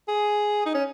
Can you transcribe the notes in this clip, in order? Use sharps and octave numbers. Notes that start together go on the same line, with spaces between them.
G#4
D#4
C#4